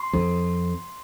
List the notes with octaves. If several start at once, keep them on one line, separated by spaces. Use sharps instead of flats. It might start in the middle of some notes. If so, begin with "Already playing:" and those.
Already playing: C6
F2